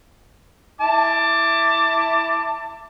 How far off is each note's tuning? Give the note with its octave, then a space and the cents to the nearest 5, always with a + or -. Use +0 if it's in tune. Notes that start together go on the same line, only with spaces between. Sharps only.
E4 +0 A5 +20 D6 +0